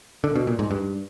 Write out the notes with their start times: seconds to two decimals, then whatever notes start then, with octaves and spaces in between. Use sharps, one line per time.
0.24 D3
0.35 B2
0.47 A#2
0.59 G#2
0.71 G2